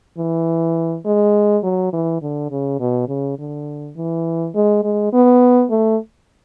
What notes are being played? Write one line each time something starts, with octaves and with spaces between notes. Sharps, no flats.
E3
G#3
F#3
E3
D3
C#3
B2
C#3
D3
E3
G#3
G#3
B3
A3